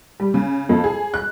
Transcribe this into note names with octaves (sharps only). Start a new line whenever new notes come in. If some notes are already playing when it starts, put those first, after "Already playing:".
G3
C#3
F2
G#4
F#6